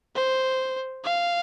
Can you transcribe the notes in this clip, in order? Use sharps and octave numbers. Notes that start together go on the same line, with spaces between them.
C5
F5